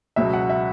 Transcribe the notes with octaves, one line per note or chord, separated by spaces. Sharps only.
C#2 B2 F#3 E5
F#5
E5